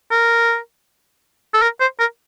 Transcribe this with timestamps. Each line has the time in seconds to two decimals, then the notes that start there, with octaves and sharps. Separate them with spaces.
0.11 A#4
1.54 A4
1.62 A#4
1.80 C5
1.99 A#4